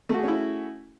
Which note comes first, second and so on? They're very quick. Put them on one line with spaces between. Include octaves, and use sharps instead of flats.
A3 F#4 G#4 C#4 E4